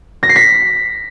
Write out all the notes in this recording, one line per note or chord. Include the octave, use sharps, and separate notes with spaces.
A#6
C7
B6